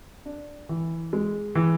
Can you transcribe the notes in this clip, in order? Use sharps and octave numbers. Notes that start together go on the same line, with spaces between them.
D4
E3
G#3
E3